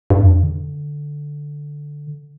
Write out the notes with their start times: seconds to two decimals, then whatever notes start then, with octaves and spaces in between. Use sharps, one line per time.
0.10 G2
0.18 F2
0.43 D3